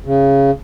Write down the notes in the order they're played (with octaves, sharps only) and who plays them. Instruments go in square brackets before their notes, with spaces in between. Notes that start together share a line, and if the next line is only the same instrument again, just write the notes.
[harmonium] C#3